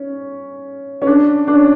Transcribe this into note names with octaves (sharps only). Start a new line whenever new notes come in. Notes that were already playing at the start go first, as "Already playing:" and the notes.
Already playing: C#4
C#4
D4
D4
C#4